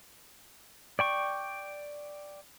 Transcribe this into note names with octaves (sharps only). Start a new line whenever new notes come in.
D5 G5 C#6